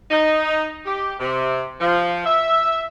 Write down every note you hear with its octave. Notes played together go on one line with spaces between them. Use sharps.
D#4
G4
C3
F3
E5